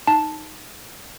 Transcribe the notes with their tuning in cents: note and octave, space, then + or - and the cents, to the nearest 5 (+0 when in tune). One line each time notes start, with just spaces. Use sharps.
D#4 +0 A5 +0